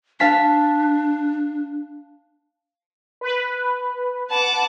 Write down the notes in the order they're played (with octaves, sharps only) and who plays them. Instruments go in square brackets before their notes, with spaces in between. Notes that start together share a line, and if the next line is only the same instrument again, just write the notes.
[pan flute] D4 [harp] F5 A5 B6
[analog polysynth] B4
[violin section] F#5 A5 D6